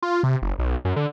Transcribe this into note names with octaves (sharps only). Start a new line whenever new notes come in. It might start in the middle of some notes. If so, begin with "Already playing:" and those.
F4
C3
F#1
B1
F#2
D3